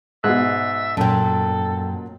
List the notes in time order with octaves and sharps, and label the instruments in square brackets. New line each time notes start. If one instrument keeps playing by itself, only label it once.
[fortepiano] G#2 B2 [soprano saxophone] E5 [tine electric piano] F#6
[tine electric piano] F#2 G5 [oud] A#2 F#3 [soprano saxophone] A4